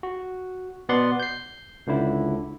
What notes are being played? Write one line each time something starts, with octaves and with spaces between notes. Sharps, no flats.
F#4
B2 B3 D5 F#5 C6
G6 C7
C#2 D3 E4